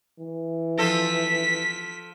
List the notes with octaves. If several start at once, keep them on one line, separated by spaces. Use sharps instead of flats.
E3
F3 A4 B6